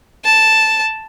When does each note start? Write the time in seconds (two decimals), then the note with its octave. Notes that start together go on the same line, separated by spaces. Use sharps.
0.25 A5